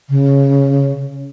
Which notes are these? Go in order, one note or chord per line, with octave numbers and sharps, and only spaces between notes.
C#3